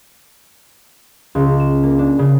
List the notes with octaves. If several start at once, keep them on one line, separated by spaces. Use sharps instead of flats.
C#2
E7
A#3
D4
C#3